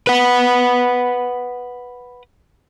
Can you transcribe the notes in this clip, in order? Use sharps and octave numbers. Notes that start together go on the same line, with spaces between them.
B4 F#5